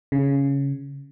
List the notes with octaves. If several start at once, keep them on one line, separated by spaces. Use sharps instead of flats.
C#3